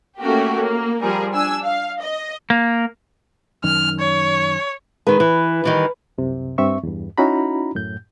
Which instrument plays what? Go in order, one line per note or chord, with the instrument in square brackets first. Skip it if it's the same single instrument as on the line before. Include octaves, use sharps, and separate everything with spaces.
[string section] A3 A#3 C#4 F#4 G4
A#3
F3 G3 G#4 A#4
D4 G#5 E6
F5
D#5
[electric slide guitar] A#3
[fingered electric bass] F#2 D#3 [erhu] F6
[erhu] C#5
[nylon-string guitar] D#3 G#3 [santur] B4
[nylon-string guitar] E3
D#3 E3 G3
[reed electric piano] C2 F#2 C3
G2 C4 E5 C#6
E2 G2
C#4 D#4 E4 F#4 A#5 B5
F#2 A2 G6